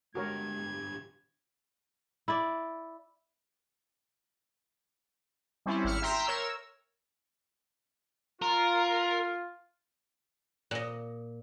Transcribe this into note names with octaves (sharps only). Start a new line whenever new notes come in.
D3 G#3 F#4 G4 A#4 C#5 G#6
E4 D5
G3 C4 C#4 E4
G#1 E4 F6 C#7
E5 G5 A#5 C6
A#4 C#5 E6
F4 A#4
A#2 D#5